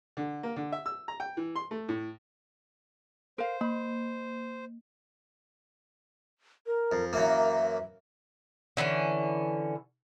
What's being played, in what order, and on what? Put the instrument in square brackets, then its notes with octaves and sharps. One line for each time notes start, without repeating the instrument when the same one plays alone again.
[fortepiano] D3
A#3
D3
E5
E6
A#5
G5
E3
C6
A3
A2
[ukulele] A#4 F5 [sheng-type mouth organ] C5
[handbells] A#3 [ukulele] B5
[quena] A#4
[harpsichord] F2
[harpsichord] F#2 E3 A#3 [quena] E5
[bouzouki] D3 E3 A3 C#4